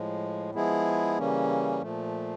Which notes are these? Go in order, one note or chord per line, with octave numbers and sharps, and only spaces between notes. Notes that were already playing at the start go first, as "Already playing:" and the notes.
Already playing: A2 F3 G#3
F3 G#3 B3 E4 G#4
C#3 E3 G3 A#3 C#4
A#2 F3 A3